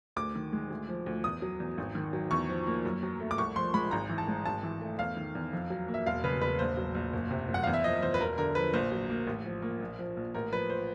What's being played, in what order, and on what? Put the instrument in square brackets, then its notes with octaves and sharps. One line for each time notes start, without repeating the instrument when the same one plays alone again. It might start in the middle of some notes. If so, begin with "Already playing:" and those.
[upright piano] D2 D6
D#3
G#3
D2
F3
D2
E2 D#6
F#3
E2
G#1
D#3
F#3
E2 C#6
F3
A#3
F#2
F#3
A3
D6
C2 C#6
F3 C6
G#3 B5
G#1 A#5
E3
A5
G#3
G#1 A5
E3
A3
E2 F5
D#3
E2
F2
F#3
A#3
E5
E1 F5
C#3 B4
E1 B4
A#1 C5
F#3
A#1
F#1
C3
F#1
F#5
E2 F5
E5
F3 D#5
E2 C5
B4
E1 A#4
D3 A#4
F3 B4
A#1 C5
F#3
A#3
A1
F3
A#3
A#1
F3
A#1
A1 A#4
F3 B4
C5